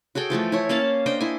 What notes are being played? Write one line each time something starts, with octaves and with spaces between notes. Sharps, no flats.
F#4 G#4 A4 G5
E3 F3 A3 A4
E4 C#5
A#3 C#4 F5 A5
D4 C5 D#5 G5
E4 C5 G#5